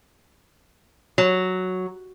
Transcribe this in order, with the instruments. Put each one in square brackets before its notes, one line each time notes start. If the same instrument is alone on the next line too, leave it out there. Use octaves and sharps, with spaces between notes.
[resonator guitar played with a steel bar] F#3